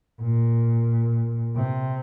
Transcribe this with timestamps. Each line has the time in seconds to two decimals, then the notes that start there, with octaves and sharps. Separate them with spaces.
0.21 A#2
1.56 C3